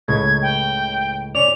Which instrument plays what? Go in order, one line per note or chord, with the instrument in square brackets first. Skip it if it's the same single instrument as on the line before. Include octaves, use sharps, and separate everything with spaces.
[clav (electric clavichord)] C#2 A2 C#3 [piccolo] G#6
[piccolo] G5
[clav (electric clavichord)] C#4 C#5 D5 [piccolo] F7